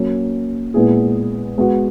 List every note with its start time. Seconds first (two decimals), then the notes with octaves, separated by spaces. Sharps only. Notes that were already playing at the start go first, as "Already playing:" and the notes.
Already playing: F#3 A#3 C#4
0.74 A#2 G#3 B3 E4 G#4
1.58 G#3 B3 F#4